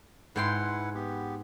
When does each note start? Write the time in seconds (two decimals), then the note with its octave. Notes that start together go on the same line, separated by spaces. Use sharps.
0.36 G#2 E4 B4 F#5 G5 C6
0.95 B3 G4